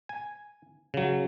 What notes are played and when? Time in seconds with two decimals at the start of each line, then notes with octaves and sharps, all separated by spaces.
0.09 G#5
0.94 C#3 F#3